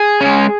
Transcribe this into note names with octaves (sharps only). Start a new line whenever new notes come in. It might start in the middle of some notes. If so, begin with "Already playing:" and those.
Already playing: G#4
G#3 C#4